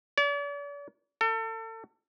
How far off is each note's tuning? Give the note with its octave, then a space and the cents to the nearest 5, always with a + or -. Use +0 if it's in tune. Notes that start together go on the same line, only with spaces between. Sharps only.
D5 -45
A4 +35